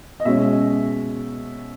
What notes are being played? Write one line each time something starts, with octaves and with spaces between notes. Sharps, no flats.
D#5
B2 G#3 C#4 E5